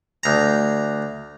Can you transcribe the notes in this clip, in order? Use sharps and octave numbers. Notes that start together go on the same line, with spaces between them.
D2 A#5